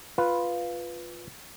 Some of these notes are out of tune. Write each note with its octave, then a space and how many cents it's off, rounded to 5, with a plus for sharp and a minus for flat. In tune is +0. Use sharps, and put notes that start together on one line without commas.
F4 +0 B4 +0